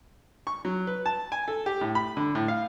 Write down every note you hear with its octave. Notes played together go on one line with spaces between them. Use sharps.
C#6
F#3
B4
A5
G#5
A4
G4
A2
B5
D3
A2
F5